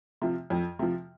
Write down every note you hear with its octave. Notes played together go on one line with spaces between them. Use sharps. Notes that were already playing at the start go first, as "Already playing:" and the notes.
C3 F3
F2
C3 F3